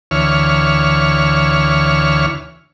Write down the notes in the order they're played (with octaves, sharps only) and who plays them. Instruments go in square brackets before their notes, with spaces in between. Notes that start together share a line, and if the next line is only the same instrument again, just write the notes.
[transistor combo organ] D2 E3 C#5 F6